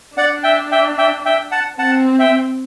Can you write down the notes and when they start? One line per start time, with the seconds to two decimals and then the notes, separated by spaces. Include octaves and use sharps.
0.17 D4 D5 F#5
0.44 E5 G5
0.72 E5 G5
0.98 E5 G5
1.26 E5 G5
1.51 F#5 A5
1.79 C4 F#5 A5
2.19 E5 G5